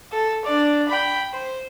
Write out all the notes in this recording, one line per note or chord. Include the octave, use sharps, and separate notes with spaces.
A4
D4 D5
G5 B5
C5